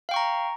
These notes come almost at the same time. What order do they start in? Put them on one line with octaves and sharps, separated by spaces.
F5 G5 C#6 A#5